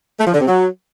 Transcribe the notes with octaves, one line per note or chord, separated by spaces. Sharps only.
A3
F3
D3
C3
F#3